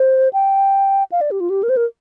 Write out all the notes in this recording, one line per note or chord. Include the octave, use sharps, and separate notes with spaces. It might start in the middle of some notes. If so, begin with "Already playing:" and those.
Already playing: C5
G5
F5
D5
G4
F4
G4
A#4
C5
A#4